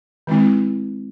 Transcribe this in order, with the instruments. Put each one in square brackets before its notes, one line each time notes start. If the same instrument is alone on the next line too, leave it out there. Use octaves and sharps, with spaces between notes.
[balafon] D#3 G#3 C4 E4